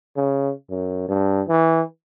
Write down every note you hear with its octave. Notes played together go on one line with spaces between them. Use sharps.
C#3
F#2
G2
E3